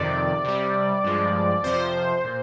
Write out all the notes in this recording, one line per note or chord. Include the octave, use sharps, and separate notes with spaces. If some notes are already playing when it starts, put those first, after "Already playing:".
Already playing: F2 C3 D#3 D5
C3 G3
G2 F3 G#3
F2 C3 F3 C5
A#2